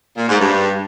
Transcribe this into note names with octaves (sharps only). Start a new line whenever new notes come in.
A#2
G#2
G2